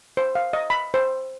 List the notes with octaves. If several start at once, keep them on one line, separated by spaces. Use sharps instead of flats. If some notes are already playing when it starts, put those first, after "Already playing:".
C5
F5
D#5
B5
C5